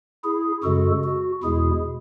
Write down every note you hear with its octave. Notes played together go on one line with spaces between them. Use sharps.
E4 G#4
F#2 C#3 G#3 F#4 A4
F#4
E2 B2 G#3 E4 G#4